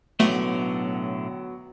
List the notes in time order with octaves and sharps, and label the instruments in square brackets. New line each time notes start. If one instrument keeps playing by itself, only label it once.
[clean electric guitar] B1 A2 D3 [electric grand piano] F#3 B3 [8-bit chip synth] A3